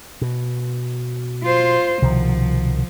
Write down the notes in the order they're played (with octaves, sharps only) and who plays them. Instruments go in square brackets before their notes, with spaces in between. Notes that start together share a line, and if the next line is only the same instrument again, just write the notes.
[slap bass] B2
[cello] F4 C5
[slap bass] C2 B2 D#3 [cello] F3